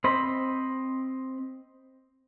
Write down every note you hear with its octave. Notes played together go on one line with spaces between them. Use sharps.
C4 C5 D#5 B5